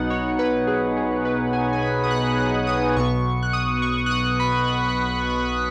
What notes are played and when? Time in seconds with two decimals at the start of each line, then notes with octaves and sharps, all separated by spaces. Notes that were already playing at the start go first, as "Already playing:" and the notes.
Already playing: B1 B2 B3 D#4 F#5
0.10 C#5
0.39 B4
0.67 G#4
0.97 G#4
1.25 B4
1.53 G#5
1.73 G#5
1.82 B5
2.04 D#6
2.11 F#6
2.39 F#6
2.67 D#6
2.96 B1 B2 B3 C#6
3.43 F#6
3.53 D#6
3.82 C#6
4.06 F#6
4.11 D#6
4.40 B5